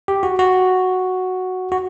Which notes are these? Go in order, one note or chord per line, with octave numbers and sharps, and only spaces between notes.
G4
F#4
F#4
F#4